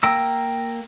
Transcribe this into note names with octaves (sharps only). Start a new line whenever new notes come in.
A#3 G5 A#5 E6